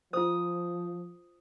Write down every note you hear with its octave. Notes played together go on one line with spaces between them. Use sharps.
F3 F4 C5 D#6